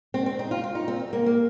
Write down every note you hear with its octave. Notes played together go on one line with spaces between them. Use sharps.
C4
C4
D#4
F4
F4
D#4
C4
C4
A#3
A#3